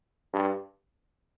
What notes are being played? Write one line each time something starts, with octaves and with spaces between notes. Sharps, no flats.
G2